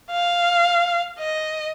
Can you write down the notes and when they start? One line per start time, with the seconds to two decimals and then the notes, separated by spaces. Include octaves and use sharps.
0.11 F5
1.19 D#5